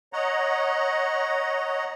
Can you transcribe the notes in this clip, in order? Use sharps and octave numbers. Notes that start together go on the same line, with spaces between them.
C#5 D#5 F#5 A#5